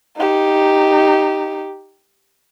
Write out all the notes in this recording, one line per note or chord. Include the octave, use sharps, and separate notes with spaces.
D#4 G4